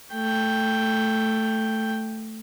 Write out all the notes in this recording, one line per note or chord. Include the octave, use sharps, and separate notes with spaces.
A3 G5